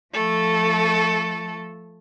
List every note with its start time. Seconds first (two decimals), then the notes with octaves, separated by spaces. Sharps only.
0.14 F3 A3 A4